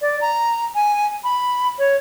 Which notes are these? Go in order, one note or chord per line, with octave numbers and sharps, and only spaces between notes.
D5
A#5
G#5
B5
C#5